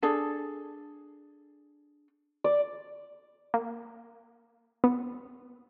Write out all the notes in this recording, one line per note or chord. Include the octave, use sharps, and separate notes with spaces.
D4 G#4 A4
D5
A#3
B3